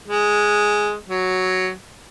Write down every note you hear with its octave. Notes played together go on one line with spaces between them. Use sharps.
G#3
F#3